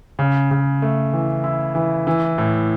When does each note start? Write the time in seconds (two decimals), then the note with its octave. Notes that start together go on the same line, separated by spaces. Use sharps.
0.19 C#3
0.51 C#3
0.82 A3
1.13 E3
1.44 E4
1.75 E3
2.07 E3
2.38 A2